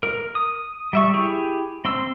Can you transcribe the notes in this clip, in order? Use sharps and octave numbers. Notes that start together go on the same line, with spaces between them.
A#4
D#6
G3 E5 C#6
E4 G4 G#4
C4 C6 E6